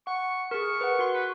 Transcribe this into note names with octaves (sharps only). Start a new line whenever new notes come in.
F#5 C#6
G#4 A#4 C#6
B4 F#5
F#4 C6
B4